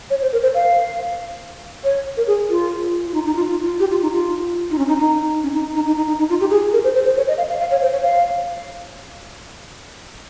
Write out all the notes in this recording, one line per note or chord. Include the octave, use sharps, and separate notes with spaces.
C#5
C5
A#4
C5
F5
C#5
A#4
G#4
F4
F4
D#4
D#4
F4
F4
F4
G4
F4
D#4
F4
D#4
C#4
D#4
D#4
C#4
D#4
D#4
D#4
D#4
D#4
D#4
F4
G4
G#4
A#4
C5
C5
C5
C#5
D#5
F5
F5
F5
C#5
C5
C#5
F5